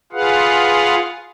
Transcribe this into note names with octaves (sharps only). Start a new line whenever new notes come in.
F4 G#4 B4 F5 F#5